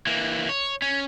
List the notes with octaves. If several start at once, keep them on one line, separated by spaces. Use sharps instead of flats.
E3 A#3
C#5
C#4